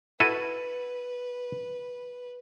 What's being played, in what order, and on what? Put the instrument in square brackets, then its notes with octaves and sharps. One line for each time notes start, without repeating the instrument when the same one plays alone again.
[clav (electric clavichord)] E4 F#4 A4 [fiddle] B4 [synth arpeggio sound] D#7